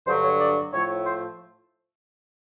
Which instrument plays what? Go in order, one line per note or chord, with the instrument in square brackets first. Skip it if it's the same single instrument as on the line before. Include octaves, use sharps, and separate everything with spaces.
[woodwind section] G2 D3 F#3 C5
C#5
D5
A2 F3 A3 C#5
C5